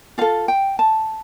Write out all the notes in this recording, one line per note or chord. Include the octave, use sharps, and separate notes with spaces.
F4 A4 F5
G5
A5